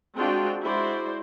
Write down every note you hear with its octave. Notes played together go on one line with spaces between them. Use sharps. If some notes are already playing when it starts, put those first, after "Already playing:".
G#3 C4 D4 F4 F#4 G5
G#3 E4 F#4 C5 D5